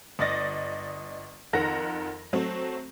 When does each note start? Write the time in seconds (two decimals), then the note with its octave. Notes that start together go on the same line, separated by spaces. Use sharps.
0.19 G1 D5 D#5 A6 A#6
1.53 F2 D#3 A#4 F#5 A#6
2.33 F#3 A3 C4